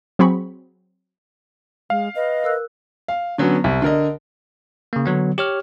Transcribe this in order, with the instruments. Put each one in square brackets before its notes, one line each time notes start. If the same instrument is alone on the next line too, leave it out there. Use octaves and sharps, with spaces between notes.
[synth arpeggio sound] F#3 C4 G#4 B5 C#6
[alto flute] G#3 [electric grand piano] F5
[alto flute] B4 [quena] D#5
[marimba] A#4 E6 F#6
[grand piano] F5
D3 F#3 B3 C#4
C2
D3 A#4 D#5
[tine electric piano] C#3 A#3
D3 F#3 B3
G4 C#5 F6